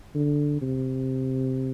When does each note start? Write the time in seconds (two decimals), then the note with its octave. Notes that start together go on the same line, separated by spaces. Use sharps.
0.15 D3
0.62 C3